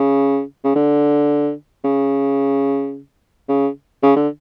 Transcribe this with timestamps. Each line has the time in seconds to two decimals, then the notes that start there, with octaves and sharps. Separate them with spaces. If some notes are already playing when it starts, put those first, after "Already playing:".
Already playing: C#3
0.64 C#3
0.75 D3
1.84 C#3
3.49 C#3
4.03 C#3
4.16 D3